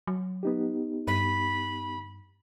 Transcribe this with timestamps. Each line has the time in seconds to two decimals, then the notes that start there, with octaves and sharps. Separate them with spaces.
0.07 F#3
0.43 B3 D#4 G4
1.07 G2 B5